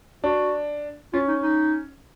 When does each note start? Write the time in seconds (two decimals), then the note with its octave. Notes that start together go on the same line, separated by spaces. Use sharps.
0.24 D4 F#4
1.13 C#4 F4
1.28 D#4
1.43 D#4